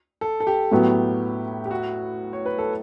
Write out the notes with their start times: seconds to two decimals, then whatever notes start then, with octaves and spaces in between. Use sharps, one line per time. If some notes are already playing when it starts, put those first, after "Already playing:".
0.21 A4
0.40 A4
0.47 G4
0.71 A2 F#3 B3
1.66 G4
1.71 F#4
2.33 C#5
2.46 B4
2.58 A4